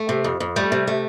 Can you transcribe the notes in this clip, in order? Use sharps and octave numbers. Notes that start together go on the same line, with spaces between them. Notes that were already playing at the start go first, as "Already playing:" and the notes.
Already playing: A3
C3
F2
F2
G3 A3
C3
A3